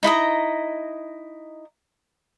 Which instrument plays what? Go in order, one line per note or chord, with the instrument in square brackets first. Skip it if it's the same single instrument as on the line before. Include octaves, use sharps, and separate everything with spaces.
[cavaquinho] D#4 E4 D#5 A#5